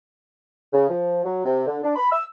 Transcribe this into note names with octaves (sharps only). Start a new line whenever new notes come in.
C#3
F3
F#3
C3
D3
D4
B5
E6